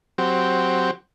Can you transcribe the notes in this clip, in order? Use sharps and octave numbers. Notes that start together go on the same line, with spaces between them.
F#3 C4 G4